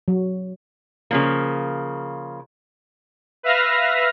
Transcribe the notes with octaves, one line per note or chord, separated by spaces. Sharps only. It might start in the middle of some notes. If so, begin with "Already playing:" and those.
F#3
C#3 F3 A#3
B4 E5 F5 F6 A#6